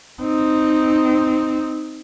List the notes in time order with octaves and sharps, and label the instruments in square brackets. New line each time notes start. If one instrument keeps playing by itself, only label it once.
[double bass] C4 D#4